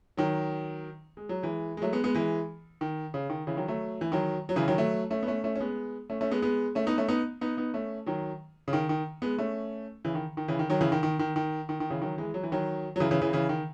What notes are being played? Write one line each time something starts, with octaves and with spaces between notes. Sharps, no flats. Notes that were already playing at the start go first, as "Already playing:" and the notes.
D#3 F#3
G#3
F#3
E3 G#3
G#3
F#3 A3
G#3 B3
G#3 B3
E3 G#3
D#3
C#3
D#3
C#3 E3
D#3 F#3
F#3 A3
E3
D#3 F#3
F#3
C#3 E3
D#3 F#3
F#3 A3
A3 C#4
B3
A3 C#4
A3 C#4
C#4
G#3 B3
A3 C#4
A3 C#4
G#3 B3
G#3 B3
A3 C#4
B3 D#4
A3 C#4
B3 D#4
B3 D#4
B3 D#4
A3 C#4
D#3 F#3
C#3
D#3
D#3
G#3 B3
A3 C#4
C#3 E3
D#3
D#3
C#3 E3
D#3
D#3 F#3
C#3 E3
D#3
D#3
D#3
D#3
D#3
D#3
C#3 E3
D#3 F#3
E3 G#3
F#3
E3
D#3 F#3
F#3
C#3 E3
C#3 E3
C#3 E3
C#3 E3
D#3